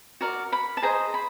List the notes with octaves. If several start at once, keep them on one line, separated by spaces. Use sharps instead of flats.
F#4 A#4 D5
B5
A5
G#4 C5 D#5 A#5
B5